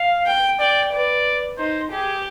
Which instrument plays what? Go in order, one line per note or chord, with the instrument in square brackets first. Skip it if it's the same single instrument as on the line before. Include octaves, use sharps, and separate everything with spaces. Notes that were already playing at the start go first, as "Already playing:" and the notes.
Already playing: [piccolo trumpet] F5
[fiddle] G5
[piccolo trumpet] D5 [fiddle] G5
[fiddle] B4 [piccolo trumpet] D5
[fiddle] D#4 [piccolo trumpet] C5
[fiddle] G4 [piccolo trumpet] G#4